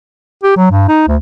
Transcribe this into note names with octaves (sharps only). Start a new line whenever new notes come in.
G4
F#3
G2
D#4
D2